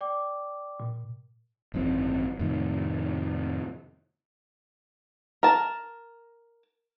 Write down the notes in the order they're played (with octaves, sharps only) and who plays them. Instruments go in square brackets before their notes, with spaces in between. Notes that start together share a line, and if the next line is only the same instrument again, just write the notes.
[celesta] D5 G5 D6
[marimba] A#2
[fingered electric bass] G#1 F#2 E3 C4
F2 A2 C3 D#3
[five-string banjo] A#4 A5